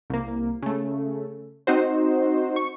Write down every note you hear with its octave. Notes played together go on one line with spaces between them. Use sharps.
C2 A#3
C#3 A3
C4 D#4 F#4 C5
C#6